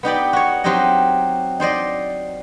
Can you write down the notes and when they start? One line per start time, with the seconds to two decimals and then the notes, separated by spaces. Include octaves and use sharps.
0.03 B3 D#4 G4 D5
0.33 F#4 C#5
0.64 F#3 C4 D#4 G4 D#5
1.60 D#4 C5 D5 D#5